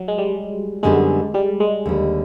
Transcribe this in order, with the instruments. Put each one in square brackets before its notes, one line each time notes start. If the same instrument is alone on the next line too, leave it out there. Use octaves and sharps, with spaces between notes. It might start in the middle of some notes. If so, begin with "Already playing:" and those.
Already playing: [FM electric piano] F#3
G#3
G3
[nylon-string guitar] F#2 D3 G3 B3 D#4 [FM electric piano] G#3
[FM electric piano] G3
G#3
[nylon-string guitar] D#2 D3 G3